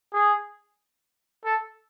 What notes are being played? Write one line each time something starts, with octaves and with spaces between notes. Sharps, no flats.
G#4
A4